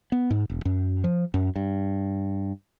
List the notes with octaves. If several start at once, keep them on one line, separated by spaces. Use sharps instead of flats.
B3
G#2
E1
F#2
F3
F#2
G2